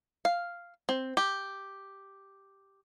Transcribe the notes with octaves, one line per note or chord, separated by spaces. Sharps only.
F5
C4
G4